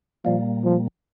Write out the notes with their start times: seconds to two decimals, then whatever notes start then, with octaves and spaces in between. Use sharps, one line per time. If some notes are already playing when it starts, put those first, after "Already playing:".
0.25 A#2 F3 G3 A#3
0.64 F3